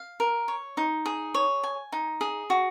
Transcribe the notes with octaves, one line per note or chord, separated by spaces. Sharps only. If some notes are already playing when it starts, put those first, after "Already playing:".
Already playing: F5
A#4
C#5
D#4
G#4
C#5
G#5
D#4
G#4
F#4